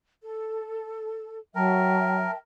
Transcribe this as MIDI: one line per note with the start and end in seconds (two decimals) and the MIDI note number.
0.23 1.38 69
1.55 2.26 54
1.55 2.31 70
1.55 2.37 76
1.55 2.37 79
1.55 2.37 81